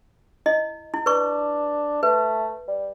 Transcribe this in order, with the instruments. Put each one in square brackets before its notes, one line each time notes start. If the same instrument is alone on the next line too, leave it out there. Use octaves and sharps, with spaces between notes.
[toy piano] E4 D#5
E4
[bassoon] D4 [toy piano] B4 C#6
[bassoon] A3 [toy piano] B4
[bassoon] G3